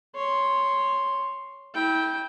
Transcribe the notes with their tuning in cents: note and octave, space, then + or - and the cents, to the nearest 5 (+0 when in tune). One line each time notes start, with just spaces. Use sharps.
C#5 +0 C6 +0
E4 -30 G5 +0